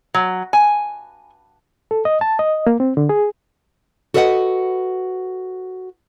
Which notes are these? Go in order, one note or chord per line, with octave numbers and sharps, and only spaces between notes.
F#3
G#5
A4
D#5
A5
D#5
A#3
C4
D3
G#4
F#4 A4 B4 D#5 E5 F#5